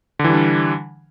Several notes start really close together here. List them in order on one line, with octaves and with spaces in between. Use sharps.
D3 E3 G3 D4